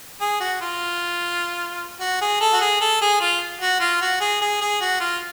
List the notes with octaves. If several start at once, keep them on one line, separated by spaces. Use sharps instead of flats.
G#4
F#4
F4
F#4
G#4
A4
F#4
G#4
A4
G#4
F4
F#4
F4
F#4
G#4
G#4
G#4
F#4
F4